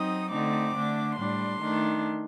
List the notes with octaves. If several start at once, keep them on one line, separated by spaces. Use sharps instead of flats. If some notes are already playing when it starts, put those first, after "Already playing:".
Already playing: F#3 C4 D#4 D#6
D3 A3 C4 D#4 D6
D3 A3 D4
A2 G3 D4 C6
D#3 A3 D4